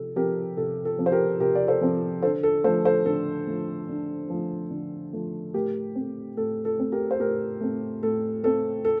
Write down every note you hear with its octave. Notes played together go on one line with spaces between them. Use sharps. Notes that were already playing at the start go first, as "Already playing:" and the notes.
Already playing: C3 F3 A4
F3 C4 G4 A#4
C3 A4
A4
F3 C4
C5
G4 A#4
C3 G4 A#4
D5
A4 C5
F3 C4
D3 A4 C5
A4
F3 A3 A4 C5
A4 C5
D3 A4
F3 A3
D3
F3 A3
D3
F3 A3
A2 G4 A#4
A3 C4
A2 A4
A4
A3 C4
G4 A#4
C5
A2 G4 A#4
A3 C4
A2 A4
A3 C4 A4
A4